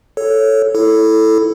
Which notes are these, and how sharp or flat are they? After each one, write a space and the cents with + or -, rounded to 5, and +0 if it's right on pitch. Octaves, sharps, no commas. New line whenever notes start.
A4 +0 C#5 +0
E4 +0 A4 +0